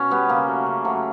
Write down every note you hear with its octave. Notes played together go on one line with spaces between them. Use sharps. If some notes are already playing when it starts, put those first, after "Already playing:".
Already playing: B2 C#4
G3 B3
C#3 A#3
F#3 A3
C#3
F#3 A3